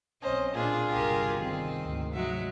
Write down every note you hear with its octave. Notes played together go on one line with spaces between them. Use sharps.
B1 C4 C#4 C5 D#5
A#2 D4 F4 G#4
G1 C2 C3 G4 A#4
D#3 C4
D2 G#2 C3
F#3 G#3 E5